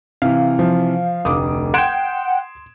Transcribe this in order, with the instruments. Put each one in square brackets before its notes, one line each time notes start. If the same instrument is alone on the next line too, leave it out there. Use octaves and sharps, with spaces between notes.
[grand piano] C3 E3 [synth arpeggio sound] F5
[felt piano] F3
[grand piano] F1 D2 [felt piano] D6 D#6
[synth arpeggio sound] F#5 G5 [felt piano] C6 [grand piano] G#6 D7 E7